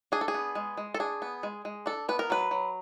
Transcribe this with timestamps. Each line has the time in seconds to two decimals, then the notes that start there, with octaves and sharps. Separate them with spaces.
0.12 D4 G#4
0.21 A4
0.28 G#4
0.34 B3
0.55 G#3
0.77 G#3
0.94 A4
1.00 D4 G#4
1.22 B3
1.43 G#3
1.65 G#3
1.86 D4 A4
2.09 B3 B4
2.19 A#4
2.30 F#3 B4
2.51 F#3